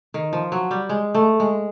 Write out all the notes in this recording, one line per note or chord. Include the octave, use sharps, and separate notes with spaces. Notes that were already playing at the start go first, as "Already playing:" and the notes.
D#3
F3
F#3
G3
G#3
A3
G#3